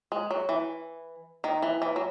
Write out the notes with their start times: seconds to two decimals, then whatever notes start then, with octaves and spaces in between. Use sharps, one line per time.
0.12 G#3
0.31 F#3
0.49 E3
1.44 D#3
1.62 E3
1.82 E3
1.96 F#3